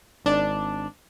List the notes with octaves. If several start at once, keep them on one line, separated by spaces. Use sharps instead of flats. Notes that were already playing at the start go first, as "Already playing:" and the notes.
G#1 D4